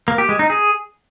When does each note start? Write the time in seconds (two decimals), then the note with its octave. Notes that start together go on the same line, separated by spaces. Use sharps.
0.08 A#3
0.18 G4
0.29 G#3
0.39 D#4
0.50 G#4